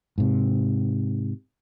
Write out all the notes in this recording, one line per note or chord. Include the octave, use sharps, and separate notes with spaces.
G#2 C3